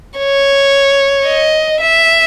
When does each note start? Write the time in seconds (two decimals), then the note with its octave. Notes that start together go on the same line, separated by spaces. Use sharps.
0.18 C#5
1.27 D#5
1.81 E5